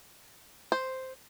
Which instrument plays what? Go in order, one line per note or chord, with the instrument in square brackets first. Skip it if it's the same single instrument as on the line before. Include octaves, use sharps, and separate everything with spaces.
[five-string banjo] C5